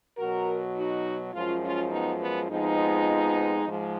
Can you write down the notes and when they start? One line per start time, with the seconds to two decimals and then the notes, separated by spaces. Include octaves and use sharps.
0.17 B2 F#3 F#4 A#4
0.75 D#4 F#4
1.33 F#2 F3 G#3 C#4 F4
1.63 C#4 F4
1.91 B3 D#4
2.22 B3
2.50 F2 F3 G#3 B3 D#4
3.65 G#2 F3 G#3